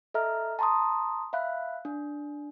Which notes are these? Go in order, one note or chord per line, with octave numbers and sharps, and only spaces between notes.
A4 D#5 E5 A#5 F6
A5 A#5 C6 C#6 D#6
E5 F5 B5 F#6
D4